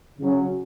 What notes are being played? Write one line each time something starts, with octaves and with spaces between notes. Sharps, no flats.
C#3 F#3 C#4